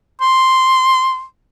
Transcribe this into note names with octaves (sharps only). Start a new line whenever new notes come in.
C6